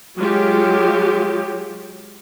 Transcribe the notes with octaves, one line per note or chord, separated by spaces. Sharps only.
F#3 G#3 F4 G4